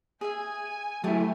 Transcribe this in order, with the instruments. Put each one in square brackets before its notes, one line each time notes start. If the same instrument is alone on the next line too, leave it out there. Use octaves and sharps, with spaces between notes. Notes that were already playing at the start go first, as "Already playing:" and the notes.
[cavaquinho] G#4 E5 [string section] G#5
[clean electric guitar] F#3 E4 [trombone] A3 [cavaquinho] G4 G#4 A5